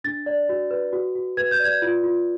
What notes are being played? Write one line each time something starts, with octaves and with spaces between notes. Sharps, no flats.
D4 A6
D5
F#4
B4
F#4
F#4
B4 G#6
G6
D5 G#6
F4
F4